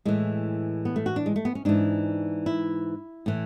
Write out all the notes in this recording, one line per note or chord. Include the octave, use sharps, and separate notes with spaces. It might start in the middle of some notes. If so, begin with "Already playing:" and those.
A2 E3 G#3
B3
A3
F#4
D4
G#3
A3
B3
C#4
G#2 E3 D4
E4
A2 E3